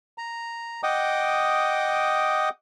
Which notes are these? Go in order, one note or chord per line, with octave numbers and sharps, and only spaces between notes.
A#5
D#5 F#5 G5 D6 D#6